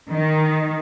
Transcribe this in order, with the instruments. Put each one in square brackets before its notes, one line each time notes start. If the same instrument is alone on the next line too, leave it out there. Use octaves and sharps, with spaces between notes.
[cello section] D#3